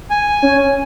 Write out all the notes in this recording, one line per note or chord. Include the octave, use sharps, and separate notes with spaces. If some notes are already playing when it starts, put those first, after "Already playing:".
G#5
C#4